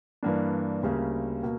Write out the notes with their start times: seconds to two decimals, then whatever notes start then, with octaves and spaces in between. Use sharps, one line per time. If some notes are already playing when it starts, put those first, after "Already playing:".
0.23 G2 E3 A#3 D4
0.83 D2 C#3 G3 A#3
1.43 B2 A#3